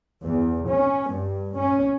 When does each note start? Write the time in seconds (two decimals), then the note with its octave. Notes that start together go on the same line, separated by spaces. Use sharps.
0.24 E2
0.69 C#4
1.13 G2
1.57 C#4